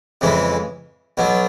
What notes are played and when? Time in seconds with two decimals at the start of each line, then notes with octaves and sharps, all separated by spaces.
0.21 F2 C#3 E3 G#3
1.17 B1 B2 F#3